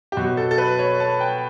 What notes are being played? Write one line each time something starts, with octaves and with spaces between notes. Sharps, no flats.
G4
B2 F#3 F#4
A4
A4
B4
C#5
A5
G5